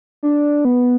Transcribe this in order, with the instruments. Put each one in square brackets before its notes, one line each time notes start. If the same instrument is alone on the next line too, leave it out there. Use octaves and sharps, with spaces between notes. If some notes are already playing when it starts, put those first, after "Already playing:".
[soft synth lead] D4
B3